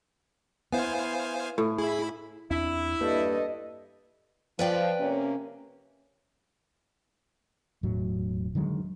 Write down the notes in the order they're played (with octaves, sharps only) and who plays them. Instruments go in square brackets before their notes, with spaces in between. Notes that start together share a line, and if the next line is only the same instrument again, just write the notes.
[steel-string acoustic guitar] B3 E4 [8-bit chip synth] C5 F5 G#5
[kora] A2
[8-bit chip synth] E4 B5 [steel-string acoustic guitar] G#4
[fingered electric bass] E2 C4 D4 [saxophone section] E4
[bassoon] G2 [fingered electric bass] A#3 [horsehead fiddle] A4 D#5
[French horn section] F3 [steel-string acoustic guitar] B4 D5 G5
[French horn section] C3 A#3 C#4
[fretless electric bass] E1 A2 F#3
D3 D#3 F#3 G#3